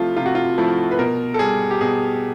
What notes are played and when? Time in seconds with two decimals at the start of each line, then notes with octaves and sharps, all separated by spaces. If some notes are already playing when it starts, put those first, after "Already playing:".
Already playing: C3 F3 A3 E4 F4
0.16 C3 F4
0.26 F#4
0.35 F4
0.58 F3 A3 E4
0.91 B4
0.99 B2 A#4
1.34 A4
1.39 G3 G#4
1.71 G4
1.81 B2 G#4